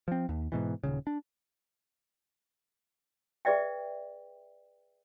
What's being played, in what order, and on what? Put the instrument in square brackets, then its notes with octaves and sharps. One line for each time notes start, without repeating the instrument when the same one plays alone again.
[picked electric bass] F3 C4
D#2
G#2 B2 E3
D#1 C#2 C#3
D4
[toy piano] G#4 B4 D5 E5 G5